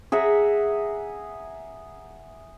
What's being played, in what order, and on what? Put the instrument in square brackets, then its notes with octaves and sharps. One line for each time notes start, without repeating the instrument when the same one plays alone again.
[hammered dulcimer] G#4 E5 F#5 A#5